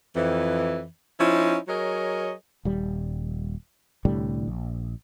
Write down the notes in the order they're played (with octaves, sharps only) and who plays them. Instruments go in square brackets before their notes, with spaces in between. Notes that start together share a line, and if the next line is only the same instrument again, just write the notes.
[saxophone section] F2 E3
F3 C#4 D#4 E4
F#3 G#4 A#4 C#5 D#5
[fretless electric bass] D#1 G3
C2 A2 D3 G3
A#1